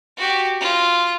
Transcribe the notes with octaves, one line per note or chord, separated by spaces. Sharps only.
F#4 G4
F4